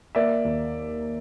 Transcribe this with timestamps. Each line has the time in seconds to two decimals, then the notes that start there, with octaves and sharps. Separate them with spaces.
0.15 A#3 D5 E5
0.44 D#2